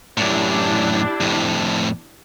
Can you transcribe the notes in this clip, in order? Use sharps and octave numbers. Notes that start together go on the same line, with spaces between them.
F#2 A2 D4 E4 G4
F2 A2